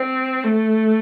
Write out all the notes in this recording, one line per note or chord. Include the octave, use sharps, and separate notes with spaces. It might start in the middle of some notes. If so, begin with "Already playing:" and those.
Already playing: C4
A3